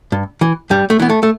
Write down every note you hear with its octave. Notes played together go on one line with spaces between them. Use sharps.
G2
E3
G2 G3
A3
E3 B3
A3
A3